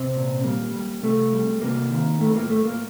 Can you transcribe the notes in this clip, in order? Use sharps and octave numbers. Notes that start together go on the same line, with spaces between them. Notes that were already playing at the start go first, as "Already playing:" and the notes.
Already playing: C3 C4
A#2
G3 A#3
G3
C3 A3
G3
C3 A#3
D#3
A2 A3
A#3
A2 A3
A#3